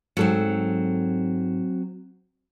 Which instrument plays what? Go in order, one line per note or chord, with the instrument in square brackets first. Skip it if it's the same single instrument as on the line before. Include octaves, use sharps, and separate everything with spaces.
[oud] G#2 A4 [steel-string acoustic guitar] F#3 C4